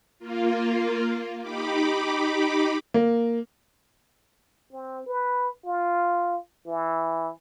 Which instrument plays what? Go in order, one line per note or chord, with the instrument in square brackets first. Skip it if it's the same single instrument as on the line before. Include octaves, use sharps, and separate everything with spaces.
[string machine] A#3 F4
D#4 G4 B5 D6
[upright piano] A#3
[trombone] C4
B4
F4
E3